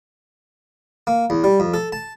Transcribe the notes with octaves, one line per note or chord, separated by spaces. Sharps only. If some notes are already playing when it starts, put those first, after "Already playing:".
A#3
E2
G3
F2
A4
A5